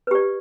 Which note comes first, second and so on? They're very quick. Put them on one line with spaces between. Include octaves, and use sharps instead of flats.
B4 G4 D5